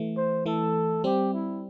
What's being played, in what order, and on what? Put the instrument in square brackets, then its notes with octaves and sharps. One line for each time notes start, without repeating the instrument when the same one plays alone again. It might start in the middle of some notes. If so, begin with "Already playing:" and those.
Already playing: [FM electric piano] E3 A3
[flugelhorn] C5
[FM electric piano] E3 A3 [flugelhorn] A4
[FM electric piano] G3 C4 [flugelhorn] G4
[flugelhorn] E4